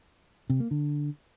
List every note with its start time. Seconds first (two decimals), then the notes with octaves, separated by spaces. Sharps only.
0.50 C3
0.60 A#3
0.71 D3